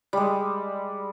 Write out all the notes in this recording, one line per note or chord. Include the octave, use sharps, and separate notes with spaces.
G3 G#3